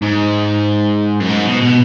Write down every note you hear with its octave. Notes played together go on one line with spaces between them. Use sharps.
G#2
F#2
G#2
B2
B2